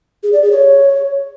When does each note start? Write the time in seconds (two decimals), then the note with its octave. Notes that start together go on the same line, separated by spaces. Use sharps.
0.23 G#4
0.33 D5
0.42 G#4
0.51 C#5